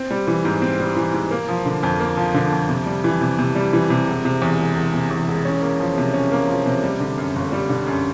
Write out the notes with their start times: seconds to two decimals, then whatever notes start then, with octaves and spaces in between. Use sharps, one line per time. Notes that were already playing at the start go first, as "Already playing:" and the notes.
Already playing: C4
0.11 G3
0.27 E3
0.45 G#2
0.62 C4
0.80 G3
0.96 E3
1.14 G#2
1.31 A#3
1.49 F3
1.65 D3
1.83 F2
2.00 A#3
2.17 F3
2.34 D3
2.52 F2
2.69 C3
2.86 G3
3.04 E3
3.21 C3
3.39 C3
3.55 G3
3.73 E3
3.90 C3
4.07 E1
4.25 C3
4.42 E2
4.59 E1
4.76 E1
4.94 C3
5.11 E2
5.28 E1
5.45 C#4
5.62 A#3
5.80 F3
5.98 C3
6.14 C#4
6.32 A#3
6.49 F3
6.66 C3
6.83 G3
7.00 D3
7.18 F#2
7.36 G1
7.52 G3
7.69 D3
7.87 F#2